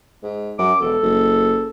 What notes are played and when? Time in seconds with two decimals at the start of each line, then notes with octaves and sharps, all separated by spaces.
0.23 G#2
0.58 F#2 D6
0.81 E1 A4
1.03 F#1